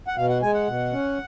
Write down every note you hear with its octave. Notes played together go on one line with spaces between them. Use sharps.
F#5
B2 F5
F#5
G#3 G#5
F#5
B2
C#4